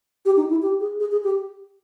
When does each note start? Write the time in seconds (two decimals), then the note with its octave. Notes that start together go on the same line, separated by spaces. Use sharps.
0.25 G4
0.37 D#4
0.50 E4
0.62 G4
0.80 G#4
1.00 G#4
1.12 G#4
1.24 G4